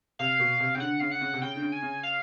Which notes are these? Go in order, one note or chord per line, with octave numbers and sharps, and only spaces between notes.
C3 F5
B2
C3
C#3 G5
D3 F#5
C#3 F5
F#5
C#3
C3
C#3 G5
D3
C#3
G#5
C#3
F5